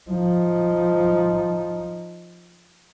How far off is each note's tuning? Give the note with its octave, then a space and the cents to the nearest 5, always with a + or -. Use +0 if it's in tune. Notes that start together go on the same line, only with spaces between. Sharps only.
F3 +0 D#4 +0